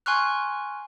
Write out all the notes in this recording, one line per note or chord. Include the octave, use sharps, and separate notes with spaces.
G#5 C6 C#6 F6 F#6